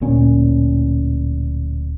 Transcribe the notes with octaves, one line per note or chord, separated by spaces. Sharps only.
D1 A#2 C#4